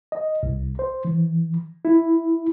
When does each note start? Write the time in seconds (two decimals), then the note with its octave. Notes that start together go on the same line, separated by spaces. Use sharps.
0.12 D#5
0.43 C2
0.79 C5
1.05 E3
1.85 E4